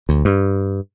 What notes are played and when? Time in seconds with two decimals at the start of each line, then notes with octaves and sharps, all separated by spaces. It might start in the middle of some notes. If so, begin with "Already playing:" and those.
0.09 D2
0.25 G2